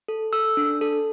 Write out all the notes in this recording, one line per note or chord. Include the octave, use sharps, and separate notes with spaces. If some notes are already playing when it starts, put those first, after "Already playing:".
A4
A4 E6
D4
A4